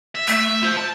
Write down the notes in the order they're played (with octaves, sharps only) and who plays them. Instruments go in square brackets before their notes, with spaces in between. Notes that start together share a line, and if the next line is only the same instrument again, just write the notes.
[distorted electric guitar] E5
[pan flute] A3 [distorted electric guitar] E5
[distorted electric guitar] F4 C5
A5